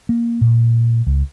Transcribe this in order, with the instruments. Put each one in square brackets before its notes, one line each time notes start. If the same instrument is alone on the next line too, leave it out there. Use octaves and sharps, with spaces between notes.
[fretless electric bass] A#3
A#2
C#2